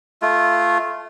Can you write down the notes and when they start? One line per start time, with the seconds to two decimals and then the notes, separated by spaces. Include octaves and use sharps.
0.22 A3 F4